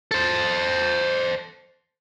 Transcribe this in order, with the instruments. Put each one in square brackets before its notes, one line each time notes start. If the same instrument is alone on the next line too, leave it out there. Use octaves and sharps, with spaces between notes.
[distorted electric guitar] A4 C5